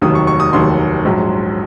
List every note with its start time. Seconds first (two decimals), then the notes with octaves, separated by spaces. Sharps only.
0.02 F1 D#2 D#3 F#3 D#6
0.15 C#6
0.27 C#6
0.40 D#6
0.53 F1 D#2 D#3 F#3 C6
1.05 A#1 G#2 F#3